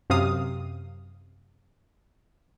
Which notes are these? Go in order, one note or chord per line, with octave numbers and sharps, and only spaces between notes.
F#2 C3 F5 D#6